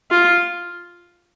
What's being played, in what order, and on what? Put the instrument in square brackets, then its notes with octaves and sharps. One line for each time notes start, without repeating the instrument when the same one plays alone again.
[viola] F4